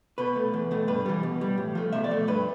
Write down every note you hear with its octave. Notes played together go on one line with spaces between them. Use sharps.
B2 B4
A3
E2
B2 A3
G2 B4
E3 G3
B2
G3
A2
F3 A3
B2 E5
D5
A3
G2 B4